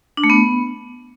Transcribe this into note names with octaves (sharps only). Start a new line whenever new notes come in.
D4
A3
B3